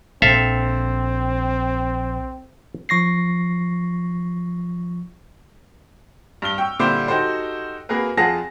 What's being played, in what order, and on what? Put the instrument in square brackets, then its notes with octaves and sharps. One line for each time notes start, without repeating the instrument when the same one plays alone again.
[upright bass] A#1 [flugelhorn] C4 [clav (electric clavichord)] A4 E5 F5
[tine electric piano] F3 C#6 A#6 C7
[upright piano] G2 F6 G7
G5 C#6 E6
A#2 D3 G3 E4 C5 D6
D#4 F#4 G4 A4 C5
A#3 F#4 G#4 A#4 B4
F2 F4 G#4 F#5 A5 A#6